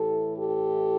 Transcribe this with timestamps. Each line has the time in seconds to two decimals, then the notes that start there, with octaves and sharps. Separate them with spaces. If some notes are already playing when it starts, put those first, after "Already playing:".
Already playing: A2 E3 G4 A4
0.37 G4 A4